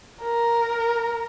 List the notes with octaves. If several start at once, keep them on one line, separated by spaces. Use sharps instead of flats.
A#4